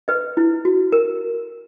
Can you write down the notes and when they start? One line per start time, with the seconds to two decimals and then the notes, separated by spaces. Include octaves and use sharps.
0.08 B4 D#5
0.37 E4
0.65 F#4
0.92 A#4